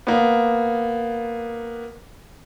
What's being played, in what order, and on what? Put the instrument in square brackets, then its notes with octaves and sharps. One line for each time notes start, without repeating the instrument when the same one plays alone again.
[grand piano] A#3 B3